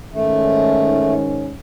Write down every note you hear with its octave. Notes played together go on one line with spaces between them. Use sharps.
G#2 D#3 A3 C#4